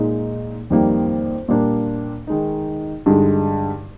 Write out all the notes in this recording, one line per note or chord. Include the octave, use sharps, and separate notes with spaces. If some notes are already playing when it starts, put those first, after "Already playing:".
Already playing: A#2 G#3 D#4
F2 D#3 G3 A#3
A#2 G3 A#3 D4
D#3 G#3 D#4
G2 D3 G#3 D#4